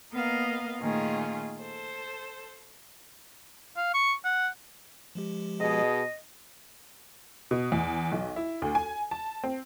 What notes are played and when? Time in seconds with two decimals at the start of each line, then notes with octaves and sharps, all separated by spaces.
0.13 A#3 B3 A#4 D#5 F5
0.80 A#2 D#3 A3 C#4 F4 G#4
1.59 A4 C5
3.77 F5
3.94 C#6
4.25 F#5
5.15 F3 G#3 G4
5.60 B2 G#4 D#5
7.51 B2
7.72 E2
8.12 B1
8.36 E4
8.62 D2
8.75 G#5
9.11 A5
9.44 C4